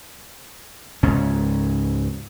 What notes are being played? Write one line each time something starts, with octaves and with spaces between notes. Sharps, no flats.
C#2 G#2 C#4